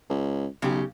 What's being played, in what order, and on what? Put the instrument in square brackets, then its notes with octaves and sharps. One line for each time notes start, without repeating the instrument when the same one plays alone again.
[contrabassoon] C#2
[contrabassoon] B1 [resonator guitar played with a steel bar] C#3 G4